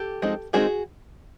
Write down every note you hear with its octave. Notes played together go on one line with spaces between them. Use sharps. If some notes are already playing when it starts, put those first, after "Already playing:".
Already playing: G4 A4
F3 G#3 C4 D#4
D#3 G#3 C4 D#4 F#4 G#4